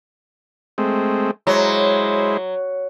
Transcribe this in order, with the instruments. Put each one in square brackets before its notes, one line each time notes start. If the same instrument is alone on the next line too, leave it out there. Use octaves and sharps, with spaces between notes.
[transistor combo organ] G#3 A3 C4
[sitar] F#3 [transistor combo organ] G#3 E4 C5